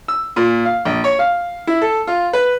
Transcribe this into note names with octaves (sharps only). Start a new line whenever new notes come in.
E6
A#2
F5
A#1
C#5
F5
E4
A4
F4
B4